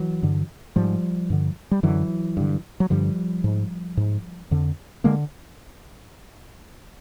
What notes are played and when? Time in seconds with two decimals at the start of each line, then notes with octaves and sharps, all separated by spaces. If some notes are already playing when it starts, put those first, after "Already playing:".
Already playing: E3 F#3
0.23 G2 D3
0.76 G#2 F3 G3
1.30 G2 D3
1.71 G3
1.83 F#2 D3 E3 F#3
2.37 G2 D3
2.80 F#3
2.90 G2 D3 F3 G3
3.44 G#2
3.97 G#2
4.51 F2 D3
5.04 D3 G#3 A#3